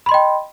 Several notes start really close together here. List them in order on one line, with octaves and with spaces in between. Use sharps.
B5 C6 D#5 G5